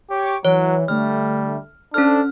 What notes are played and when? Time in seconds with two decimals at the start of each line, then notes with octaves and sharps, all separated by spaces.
0.10 G4 C#5 C#6 D6
0.45 E3 F#3 C#5
0.88 D3 G3 A3 F6
1.94 C#4 D4 A4 C5 F6